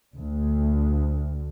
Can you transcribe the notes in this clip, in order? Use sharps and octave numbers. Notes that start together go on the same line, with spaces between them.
D2